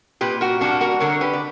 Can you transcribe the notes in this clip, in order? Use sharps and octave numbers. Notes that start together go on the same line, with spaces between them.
A#2 G4 B4
F#4 A#4
G3 A#3 D4 F#4
F#4 A#4
D3 A#4 C#5
G4 B4
D5